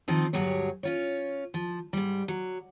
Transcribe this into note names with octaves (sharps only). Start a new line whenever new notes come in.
D#3 F3 C4 D#4
D2 G2 F#3 G4 G#4 C#5
C#4 F4 C#5
F3
G#2 G3
F#3